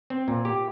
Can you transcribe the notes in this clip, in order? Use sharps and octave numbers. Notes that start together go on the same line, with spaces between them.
C4
A#2
G4